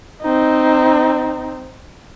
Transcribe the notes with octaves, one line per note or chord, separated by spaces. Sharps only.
C4 D#4